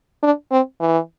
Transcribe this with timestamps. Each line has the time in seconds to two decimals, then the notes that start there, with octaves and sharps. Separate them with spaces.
0.23 D4
0.51 C4
0.80 E3